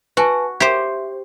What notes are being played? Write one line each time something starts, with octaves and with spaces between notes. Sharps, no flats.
F#4 B4 G#5 A5
G4 C5 E5